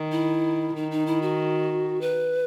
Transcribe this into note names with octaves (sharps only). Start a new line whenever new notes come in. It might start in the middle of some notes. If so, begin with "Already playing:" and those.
Already playing: D#3
E4
D#3 D#4
D#4
E4
F#4
B4